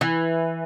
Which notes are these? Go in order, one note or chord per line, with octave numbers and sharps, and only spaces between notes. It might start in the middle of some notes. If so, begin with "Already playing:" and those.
E3